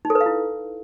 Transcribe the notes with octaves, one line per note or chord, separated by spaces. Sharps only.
D#4
A4
B4
F5
E4